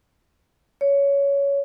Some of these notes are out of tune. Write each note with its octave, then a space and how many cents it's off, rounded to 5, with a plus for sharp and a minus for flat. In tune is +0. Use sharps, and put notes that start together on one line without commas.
C#5 +15